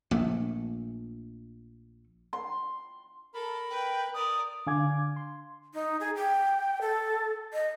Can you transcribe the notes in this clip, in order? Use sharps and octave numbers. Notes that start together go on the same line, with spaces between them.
A#1 A3
C6
A4 A#4 B5
B4 G5
A#4 D5 D#6
D3 D4 F5 G#5 D6 G#6
C6
D#4
G#4
G5
A4
D#5